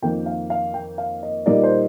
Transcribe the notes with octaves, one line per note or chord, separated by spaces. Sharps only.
F2 D#3 A#3 G5
F5
F5
G5
F5
D#5
A#2 G3 A#3 D#4 D5
C5